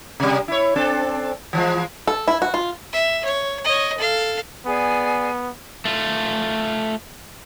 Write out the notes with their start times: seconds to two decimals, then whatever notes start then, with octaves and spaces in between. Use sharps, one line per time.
0.20 C3 G3
0.48 E4 C#5
0.76 C4 D4 A4
1.53 E3 F3 G#3
2.07 A4
2.28 E4
2.42 F#4
2.54 F4
2.92 E5
3.24 C#5
3.64 C#5 D#5
3.97 A4 F5
4.66 B3 G#4 D5 G#5
5.85 A3 F4